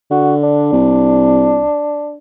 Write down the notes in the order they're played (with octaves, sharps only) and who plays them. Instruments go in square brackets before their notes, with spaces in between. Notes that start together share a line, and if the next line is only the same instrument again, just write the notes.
[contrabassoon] D3 [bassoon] F#4
[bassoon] D4
[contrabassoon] C2